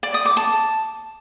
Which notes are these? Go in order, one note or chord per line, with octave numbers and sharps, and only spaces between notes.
D5
D#6
D6
A5